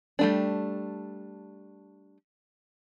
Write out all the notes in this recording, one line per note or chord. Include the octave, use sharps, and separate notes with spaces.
G3 A3 D4